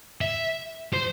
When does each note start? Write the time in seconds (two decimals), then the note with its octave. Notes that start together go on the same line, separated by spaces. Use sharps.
0.21 E5
0.93 C5